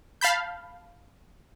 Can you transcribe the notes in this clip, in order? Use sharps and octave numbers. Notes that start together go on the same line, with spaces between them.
F5 A5 B5 G6